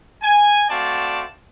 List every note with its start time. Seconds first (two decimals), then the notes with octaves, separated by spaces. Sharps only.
0.23 G#5
0.69 A3 C4 F#4 D5 F5 A5